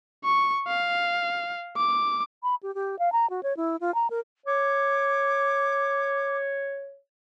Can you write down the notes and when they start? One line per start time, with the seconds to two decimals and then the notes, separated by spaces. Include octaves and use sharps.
0.25 C#6
0.68 F5
1.77 D6
2.43 B5
2.63 G4
2.75 G4
2.99 F5
3.12 A#5
3.30 F#4
3.43 C#5
3.57 E4
3.81 F4
3.95 A#5
4.10 A#4
4.46 C#5 D6